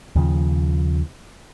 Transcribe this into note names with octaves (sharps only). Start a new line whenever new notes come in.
D#2 C#3 F3